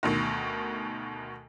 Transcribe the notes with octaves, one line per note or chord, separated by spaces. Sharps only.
D2 B2 D#3